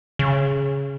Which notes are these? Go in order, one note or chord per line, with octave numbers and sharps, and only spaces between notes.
C#3